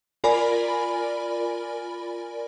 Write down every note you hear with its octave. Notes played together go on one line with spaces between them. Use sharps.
F4 A#4 D5 G#5 B5